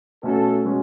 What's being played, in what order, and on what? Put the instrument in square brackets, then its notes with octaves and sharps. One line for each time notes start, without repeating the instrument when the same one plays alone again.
[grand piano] B2 A3 C#4 F#4 [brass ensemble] A4
[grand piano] B2 G#3 C#4 F#4